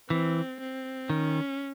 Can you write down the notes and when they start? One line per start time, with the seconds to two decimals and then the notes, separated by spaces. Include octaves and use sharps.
0.10 E3 C4
0.61 C4
1.10 D#3 C#4